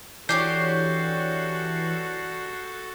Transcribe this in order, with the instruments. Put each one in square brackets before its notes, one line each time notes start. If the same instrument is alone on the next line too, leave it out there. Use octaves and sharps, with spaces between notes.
[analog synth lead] E3 [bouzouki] D4 G4 C#5 [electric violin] F#4 A4 [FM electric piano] G6 C7